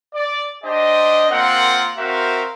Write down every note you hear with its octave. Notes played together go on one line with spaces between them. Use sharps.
D5
D4 G4 C5 D#5
A#3 C4 F4 A#4 F#5
C4 F#4 A#4 C5 E5 F5